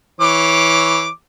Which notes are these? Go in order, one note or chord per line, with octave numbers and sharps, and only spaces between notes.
E3 C#5 D6